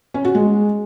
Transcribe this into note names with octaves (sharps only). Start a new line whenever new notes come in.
C#4
F#4
G#3